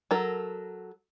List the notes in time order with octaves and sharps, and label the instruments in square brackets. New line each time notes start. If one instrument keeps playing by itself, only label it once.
[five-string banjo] F#3 A4 A#4